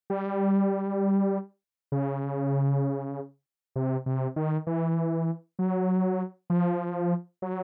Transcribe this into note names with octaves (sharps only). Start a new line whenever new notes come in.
G3
C#3
C3
C3
D#3
E3
F#3
F3
F#3